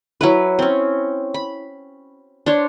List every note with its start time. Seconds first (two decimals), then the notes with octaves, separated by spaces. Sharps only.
0.21 F#3 E4 B4
0.59 C4 C#4
1.34 B5
2.46 D4 C5 C#5